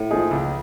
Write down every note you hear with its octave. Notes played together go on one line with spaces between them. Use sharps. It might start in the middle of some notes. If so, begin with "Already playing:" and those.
Already playing: A2
F3 A#3 D#4 G#4
C#2